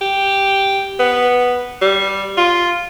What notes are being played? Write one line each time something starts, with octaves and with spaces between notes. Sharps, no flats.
G4
B3
G3
F4